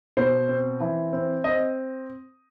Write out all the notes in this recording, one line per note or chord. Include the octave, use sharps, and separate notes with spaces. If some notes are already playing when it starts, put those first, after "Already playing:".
B2 C5
C4
E3
C4
C4 D#5